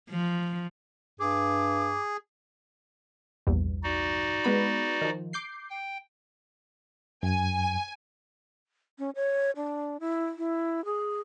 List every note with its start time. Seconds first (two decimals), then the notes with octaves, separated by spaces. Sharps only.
0.10 F3
1.20 G2 G#4 D6
3.47 A#1 E2 G2
3.84 D#4 F#4 D5
4.44 G#3 B3 B5
5.01 D#3 F3
5.33 D6 G6 C7
5.70 G5
7.23 F#2 G#5
8.99 C#4
9.16 C#5
9.56 D4
10.00 E4
10.38 E4
10.85 G#4